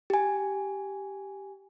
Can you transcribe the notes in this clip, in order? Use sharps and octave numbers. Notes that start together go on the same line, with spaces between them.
G4 G#5